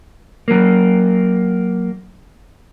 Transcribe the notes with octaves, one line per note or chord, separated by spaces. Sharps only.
F#3 A#3